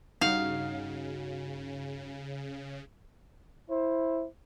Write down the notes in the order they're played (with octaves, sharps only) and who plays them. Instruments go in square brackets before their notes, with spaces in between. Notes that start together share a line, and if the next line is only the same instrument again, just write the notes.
[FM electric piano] G2 F#4 [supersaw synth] C#3 [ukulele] D#4 [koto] F5
[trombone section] E4 C5